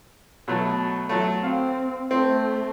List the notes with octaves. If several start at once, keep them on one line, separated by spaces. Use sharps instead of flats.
B2 F#3 A3
F#3 A3
C4 F5
A3 C4